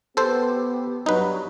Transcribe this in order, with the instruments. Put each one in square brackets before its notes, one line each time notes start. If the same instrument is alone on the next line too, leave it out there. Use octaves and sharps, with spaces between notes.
[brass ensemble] B3 G4 [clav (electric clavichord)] A4 C5
[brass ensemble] G2 F#3 [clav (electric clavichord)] D#4 B4